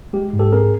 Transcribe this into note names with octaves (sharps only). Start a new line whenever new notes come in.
G#3 G4
G#2
G4 A4
C4 G#4 A#4